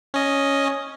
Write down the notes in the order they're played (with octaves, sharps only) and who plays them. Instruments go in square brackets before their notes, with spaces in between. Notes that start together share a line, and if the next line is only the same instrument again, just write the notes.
[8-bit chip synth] C#4 D#5